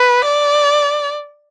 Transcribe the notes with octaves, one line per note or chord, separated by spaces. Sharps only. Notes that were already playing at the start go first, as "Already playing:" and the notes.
Already playing: B4
D5